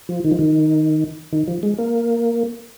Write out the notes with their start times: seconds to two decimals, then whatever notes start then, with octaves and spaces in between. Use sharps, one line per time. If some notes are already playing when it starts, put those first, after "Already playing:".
0.09 F3
0.24 D#3
0.31 F3
0.39 D#3
1.33 D#3
1.48 F3
1.63 G#3
1.79 A#3